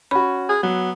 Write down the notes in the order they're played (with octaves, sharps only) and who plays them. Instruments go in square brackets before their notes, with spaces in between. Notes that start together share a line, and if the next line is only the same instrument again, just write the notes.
[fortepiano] C#4 F#4 [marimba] B5
[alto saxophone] G#4
[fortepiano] F#3 [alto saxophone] B3